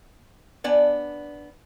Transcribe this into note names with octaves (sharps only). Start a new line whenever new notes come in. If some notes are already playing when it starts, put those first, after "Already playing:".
B3 D4 D5 G#5